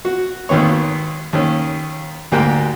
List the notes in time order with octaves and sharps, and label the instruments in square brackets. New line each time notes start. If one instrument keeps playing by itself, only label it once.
[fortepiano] F#4
G#1 D#2 D#3 B3 C#5
D#2 D#3 C#4
D2 G#2 A#3 G4 G5